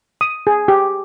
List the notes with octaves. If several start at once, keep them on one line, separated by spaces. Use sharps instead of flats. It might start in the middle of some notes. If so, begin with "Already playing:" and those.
D#6
G#4
G4